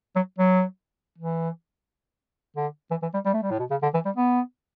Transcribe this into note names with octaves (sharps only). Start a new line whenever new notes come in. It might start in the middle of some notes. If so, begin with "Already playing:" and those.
F#3
F#3
E3
D3
E3
E3
G3
G3
A3
G3
A2
B2
C#3
D3
E3
G3
B3